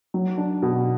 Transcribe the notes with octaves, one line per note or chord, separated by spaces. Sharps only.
F#3
D4
B2